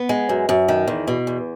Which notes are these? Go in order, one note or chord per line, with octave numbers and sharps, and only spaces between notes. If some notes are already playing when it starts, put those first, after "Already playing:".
Already playing: B3
G#3
F#2
F#2
D#3
E2
B2
E2